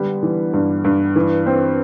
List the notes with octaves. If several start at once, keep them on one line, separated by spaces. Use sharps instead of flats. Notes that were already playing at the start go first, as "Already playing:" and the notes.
Already playing: D3 G3 B3
E3
G2
G2
E3
C4